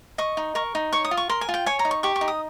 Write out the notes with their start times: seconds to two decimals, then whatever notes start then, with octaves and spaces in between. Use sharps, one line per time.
0.18 D#5 C#6
0.37 D#4
0.55 A#4 C#6
0.75 D#4
0.93 C#5 C#6
1.04 D#6
1.11 F4
1.17 C#6
1.29 A#4 C6
1.41 G#5
1.49 F4
1.54 G5
1.66 C#5 G#5
1.79 A#5
1.85 D#4
1.91 C#6
2.03 G4 C#6
2.16 C#6
2.21 D#4
2.28 D#6